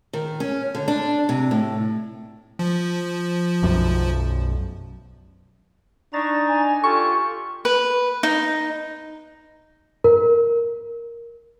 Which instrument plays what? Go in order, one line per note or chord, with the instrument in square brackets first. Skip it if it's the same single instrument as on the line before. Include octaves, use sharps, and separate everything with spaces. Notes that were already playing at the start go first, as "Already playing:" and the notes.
[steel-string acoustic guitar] D#3
C#4
D3
D4
C3
A2
[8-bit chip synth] F3
[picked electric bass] B1 F#2
[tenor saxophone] D4 [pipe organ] D#4 A#5 A6 [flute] C#6
[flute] G#5
[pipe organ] F4 G4 [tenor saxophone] A4 [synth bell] C#6
[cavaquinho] B4
D#4
[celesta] A#4